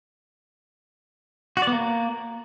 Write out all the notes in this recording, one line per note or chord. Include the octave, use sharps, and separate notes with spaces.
F#4
D5
B3
A#3